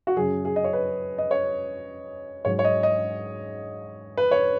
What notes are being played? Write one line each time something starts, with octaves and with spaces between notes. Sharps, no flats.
F#4
F#2 C#3 F#3 G#4
G#4
D#5
C#5
B4
D#5
C#5
G#2 F#3 C#5
C#5
D#5
D#5
B4
C#5